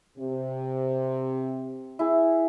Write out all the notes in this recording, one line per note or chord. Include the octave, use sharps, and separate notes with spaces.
C3
E4 G#4